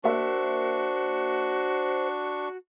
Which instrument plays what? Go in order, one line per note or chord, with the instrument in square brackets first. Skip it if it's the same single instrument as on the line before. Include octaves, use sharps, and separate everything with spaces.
[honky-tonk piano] A#3 E5 [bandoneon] D4 C#6 [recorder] F#4 [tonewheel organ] C5